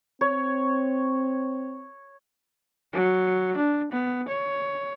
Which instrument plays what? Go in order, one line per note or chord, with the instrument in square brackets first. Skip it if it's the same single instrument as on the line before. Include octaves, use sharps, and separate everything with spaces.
[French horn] C4 [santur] C#5
[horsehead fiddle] F#3
D4
B3
C#5